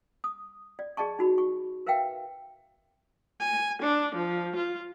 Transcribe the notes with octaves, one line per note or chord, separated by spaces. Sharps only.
D#6
D5
G#4 D5 D#5 A5 C#6
D#4 F#4 B5
C#6
A#4 B4 E5 F5 G5
G#5
D4
F3
F4